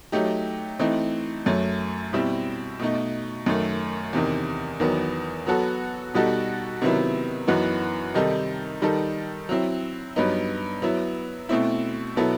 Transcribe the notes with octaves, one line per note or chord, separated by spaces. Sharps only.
F#3 A3 D#4 G4
E3 A3 C4 D#4
F#2 F#3 A3
B2 G3 C4 E4
B2 A3 D#4
F#2 D#3 A3
E2 C3 D#3
E2 D#3 F#3 B3
F#3 B3 F#4 A4
B2 G3 D#4 F#4 A4
C3 D#3 F#3 B3 E4
F#2 E3 B3 D#4 F#4
C3 D#3 G3 D#4 A4
D#3 G3 D#4 A4
F#3 C4 E4
G2 F#3 B3 D#4
F#3 B3 E4
B2 A3 C4 E4
B2 F#3 B3 E4 A4